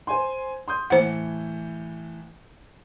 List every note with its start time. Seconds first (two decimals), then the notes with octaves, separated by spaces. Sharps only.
0.07 C5 G#5 C6
0.68 C6 D#6 G6
0.90 A2 E3 C5 F#5 C#7